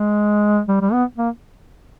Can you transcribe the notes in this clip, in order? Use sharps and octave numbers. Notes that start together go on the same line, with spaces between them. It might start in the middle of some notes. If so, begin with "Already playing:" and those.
Already playing: G#3
G3
G3
B3
A#3